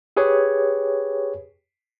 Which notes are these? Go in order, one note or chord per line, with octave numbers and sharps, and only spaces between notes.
G4 G#4 B4 C#5